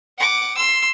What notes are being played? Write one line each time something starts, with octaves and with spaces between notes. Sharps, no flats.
F#5 D6
C6 E6